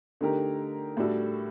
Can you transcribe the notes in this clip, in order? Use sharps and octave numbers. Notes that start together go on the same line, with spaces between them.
D3 A3 D#4 G4 A#4
A2 G3 D4 F#4 A4